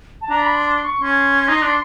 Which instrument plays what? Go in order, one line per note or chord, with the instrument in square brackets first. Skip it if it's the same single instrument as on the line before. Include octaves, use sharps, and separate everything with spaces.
[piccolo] A5
[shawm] D4 [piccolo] A#5
[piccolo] B5
C6
C6
C#6
[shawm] C#4 [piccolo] C6
[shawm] D#4
D4